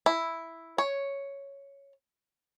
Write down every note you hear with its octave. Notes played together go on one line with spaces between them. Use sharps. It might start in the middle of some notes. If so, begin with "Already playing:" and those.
E4
C#5